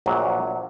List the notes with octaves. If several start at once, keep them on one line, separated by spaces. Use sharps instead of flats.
A#1 A#2 F#3